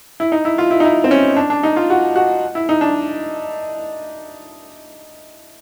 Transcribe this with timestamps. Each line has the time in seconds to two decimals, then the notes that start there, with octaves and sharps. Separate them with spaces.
0.20 E4
0.32 D#4
0.45 E4
0.58 F4
0.71 E4
0.80 D#4
0.85 E4
1.04 C4
1.11 C#4
1.36 D4
1.50 D4
1.63 D#4
1.76 F4
1.90 F#4
2.16 F#4
2.55 E4
2.69 D#4
2.81 D4